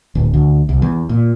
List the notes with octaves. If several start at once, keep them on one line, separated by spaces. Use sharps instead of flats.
D1
D2
C2
E2
A#2